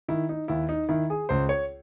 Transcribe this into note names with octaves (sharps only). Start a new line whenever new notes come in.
D#3 E4
D#4
D#2 E4
D#4
D#3 E4
G#4
C#2 C5
C#5